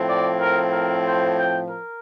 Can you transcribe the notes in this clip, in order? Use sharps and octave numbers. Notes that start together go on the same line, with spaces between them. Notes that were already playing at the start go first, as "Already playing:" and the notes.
Already playing: A2 F3 C4
D5
A#4
A#4
C5
G5
A#4